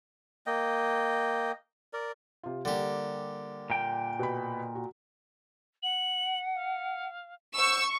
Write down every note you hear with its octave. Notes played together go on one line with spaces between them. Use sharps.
A#3 D#5 G5
A#4 D5
C3 F4
D3 G3 A#3 G4
A#2 G5
B2 B5
F#4
F#5 F#7
F5
C5 F#5 C#6 E6